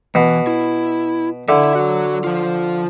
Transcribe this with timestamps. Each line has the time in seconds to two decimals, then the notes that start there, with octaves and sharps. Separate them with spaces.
0.15 B2 E3
0.47 E4
1.49 D3 E4 E5
1.75 F#3 F#4
2.24 F3 F4